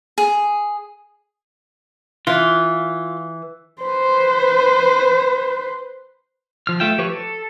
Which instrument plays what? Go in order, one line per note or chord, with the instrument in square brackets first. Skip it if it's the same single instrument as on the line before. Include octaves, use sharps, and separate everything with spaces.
[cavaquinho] G#4
[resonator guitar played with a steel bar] E3 [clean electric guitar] F4
[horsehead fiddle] B4 C5
[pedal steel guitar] F3 F6
A3 F4 E5 G5
F3 G4 B4 C#5 C#6
A4